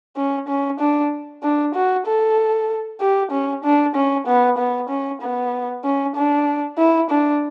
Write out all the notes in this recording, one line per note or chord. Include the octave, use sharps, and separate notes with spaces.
C#4
C#4
D4
D4
F#4
A4
G4
C#4
D4
C#4
B3
B3
C#4
B3
C#4
D4
E4
D4